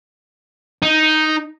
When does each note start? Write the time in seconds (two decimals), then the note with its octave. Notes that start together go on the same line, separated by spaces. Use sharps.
0.82 D#4